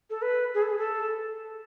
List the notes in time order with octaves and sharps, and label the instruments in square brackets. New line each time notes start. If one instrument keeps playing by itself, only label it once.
[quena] A4
B4
G#4
A4
G#4
A4